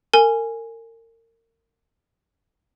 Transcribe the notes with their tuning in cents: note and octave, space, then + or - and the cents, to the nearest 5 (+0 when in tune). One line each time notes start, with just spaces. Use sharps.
A#4 -35 G#5 +0